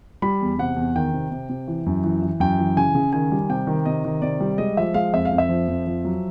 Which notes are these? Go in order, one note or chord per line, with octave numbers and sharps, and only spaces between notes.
G3 B5
E2
C3 F#5
E2
D#3 G5
C3
C3
C3
E3
F#2
E3
E3
F#2 G5
E3
C#3 G#5
C#3
D#3 G#5
G3
C3 G5
D#3
C3 D#5
D#3
C3 D5
G3
G#3 D#5
F3 E5
G#3 F5
F2 E5
F5
F2
E5
F3
F2
F3
F#3